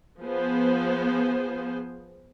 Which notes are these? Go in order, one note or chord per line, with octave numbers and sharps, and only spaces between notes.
F3 B3 G#4 C5